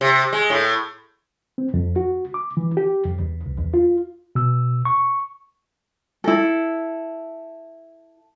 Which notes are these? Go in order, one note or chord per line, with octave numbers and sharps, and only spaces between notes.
C3
G#3
A2
C4
F2
F#4
D6
E3
G4
F2
E2
C2
E2
F4
B2 E6
C#6
E4 A4